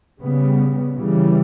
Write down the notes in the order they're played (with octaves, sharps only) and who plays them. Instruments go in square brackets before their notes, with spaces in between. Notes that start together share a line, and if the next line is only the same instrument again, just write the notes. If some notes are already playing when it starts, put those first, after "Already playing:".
[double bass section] C#3 G3 B3
C#3 E3 G3